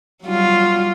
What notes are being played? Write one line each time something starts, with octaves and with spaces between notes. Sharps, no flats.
F#3 G3 F4